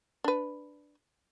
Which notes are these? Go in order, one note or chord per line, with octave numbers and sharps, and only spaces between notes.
D4 B4